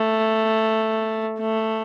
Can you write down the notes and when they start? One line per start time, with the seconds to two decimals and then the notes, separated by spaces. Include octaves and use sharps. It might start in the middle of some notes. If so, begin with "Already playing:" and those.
Already playing: A3
1.39 A3